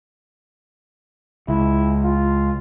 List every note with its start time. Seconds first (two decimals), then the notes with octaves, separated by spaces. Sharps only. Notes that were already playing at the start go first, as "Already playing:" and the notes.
1.48 C#2 E4
2.04 F4